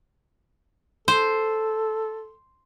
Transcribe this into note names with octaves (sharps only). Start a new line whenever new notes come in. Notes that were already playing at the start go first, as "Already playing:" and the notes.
A4 C5